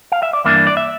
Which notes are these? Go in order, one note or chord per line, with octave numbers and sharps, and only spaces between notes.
F5
E5
D5
G2 E3 A#3 D4 E5
D5
E5